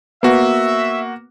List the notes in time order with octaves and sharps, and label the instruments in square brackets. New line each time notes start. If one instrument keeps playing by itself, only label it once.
[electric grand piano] A#3 F#4 [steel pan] B3 [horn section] E5